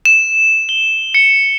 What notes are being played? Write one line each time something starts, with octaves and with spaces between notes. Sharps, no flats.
E7
G7
C#7